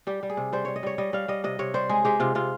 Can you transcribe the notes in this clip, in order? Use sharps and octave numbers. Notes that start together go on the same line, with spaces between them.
G3 G4
G3
G#4
C3
G3 C5
G3 C#5
D#5
G3 C#5
G3 D#5
G3 F5
G3 D#5
C3 D#5
C3 C#5
G3 C5
G#3 G#4
G#3 G4
C3 F4
C3 F4